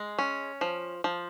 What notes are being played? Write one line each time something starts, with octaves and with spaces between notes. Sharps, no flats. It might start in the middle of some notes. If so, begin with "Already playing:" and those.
Already playing: G#3
C#4
F3
F3